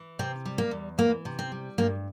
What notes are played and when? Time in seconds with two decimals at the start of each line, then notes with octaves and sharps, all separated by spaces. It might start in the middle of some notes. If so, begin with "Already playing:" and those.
Already playing: E3
0.19 C3 C4
0.46 G3
0.58 A#3
0.71 E2
0.98 E3 A#3
1.25 C3
1.39 C4
1.52 G3
1.78 G2 A#3